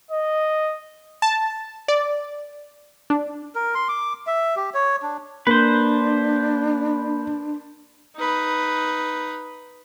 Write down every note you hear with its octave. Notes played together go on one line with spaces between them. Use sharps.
D#5
A5
D5
D4
A#4
C6
D6
E5
G4
C#5
D4
A#3 D4 B4 C5
D#4 B4